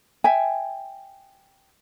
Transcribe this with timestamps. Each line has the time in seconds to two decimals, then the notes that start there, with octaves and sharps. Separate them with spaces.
0.24 E5 G5 G#5